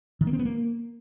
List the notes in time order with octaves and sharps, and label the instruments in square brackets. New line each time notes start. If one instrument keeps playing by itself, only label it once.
[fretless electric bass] D#3
A#3
C4
B3
A#3